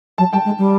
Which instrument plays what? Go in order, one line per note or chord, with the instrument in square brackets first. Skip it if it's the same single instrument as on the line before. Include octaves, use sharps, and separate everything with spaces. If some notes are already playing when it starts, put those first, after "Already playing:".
[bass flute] F#3 [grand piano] A5
[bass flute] G3 [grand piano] G5 A5
[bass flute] G#3
G3